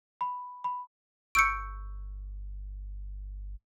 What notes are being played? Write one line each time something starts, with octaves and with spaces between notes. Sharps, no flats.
B5
B5
G1 C#6 E6 G6 C#7 D7